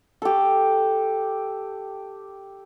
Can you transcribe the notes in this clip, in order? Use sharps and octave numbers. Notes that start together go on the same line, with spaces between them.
G4 A4